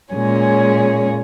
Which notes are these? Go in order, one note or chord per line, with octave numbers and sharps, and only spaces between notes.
A#2 G#3 C#4 G#4 C#5